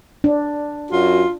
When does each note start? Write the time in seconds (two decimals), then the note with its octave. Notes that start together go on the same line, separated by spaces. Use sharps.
0.24 D4
0.91 F#2 F4 F#4